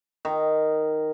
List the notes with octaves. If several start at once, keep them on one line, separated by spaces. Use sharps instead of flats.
D#3